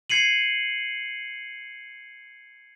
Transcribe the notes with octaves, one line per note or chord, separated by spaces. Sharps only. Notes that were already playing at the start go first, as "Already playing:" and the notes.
G#6 C7 C#7 D#7 F#7